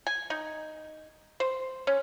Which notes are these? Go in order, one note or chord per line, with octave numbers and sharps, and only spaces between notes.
G#5
D#4
C5
C#4